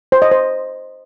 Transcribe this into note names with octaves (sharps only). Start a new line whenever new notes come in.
C5
D#5
C5